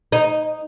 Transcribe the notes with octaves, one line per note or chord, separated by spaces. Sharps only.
D#4